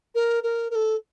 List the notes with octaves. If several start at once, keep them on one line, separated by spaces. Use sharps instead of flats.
A#4
A#4
A#4
A4